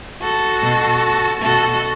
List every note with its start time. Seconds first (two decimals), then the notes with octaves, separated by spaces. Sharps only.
0.22 F#4 A4
0.62 B2
1.42 B2 F#4 A4